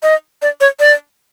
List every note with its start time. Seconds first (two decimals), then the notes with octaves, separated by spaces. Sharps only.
0.03 D#5
0.42 D5
0.61 C#5
0.80 D5